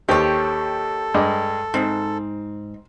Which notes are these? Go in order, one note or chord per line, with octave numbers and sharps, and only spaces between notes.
D#2 G4 A4 C5 C#5
G2 G#3 D6
G#2 C4